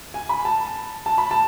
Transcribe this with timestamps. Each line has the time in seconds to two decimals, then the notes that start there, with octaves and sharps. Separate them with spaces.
0.14 G#5
0.29 B5
0.45 A5
1.06 A5
1.18 B5
1.31 A5